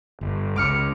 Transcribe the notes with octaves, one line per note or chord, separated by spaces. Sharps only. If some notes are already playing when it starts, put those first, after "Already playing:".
G1
C#2 D6 F6 C#7